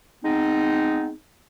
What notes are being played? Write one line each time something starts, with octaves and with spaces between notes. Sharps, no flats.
G#3 B3 C4 D#4